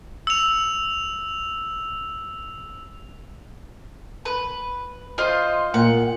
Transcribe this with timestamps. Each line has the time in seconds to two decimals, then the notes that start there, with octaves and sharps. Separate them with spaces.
0.27 E6 F7
4.25 B4
5.18 F4 C5 D#5
5.74 A#2 F#5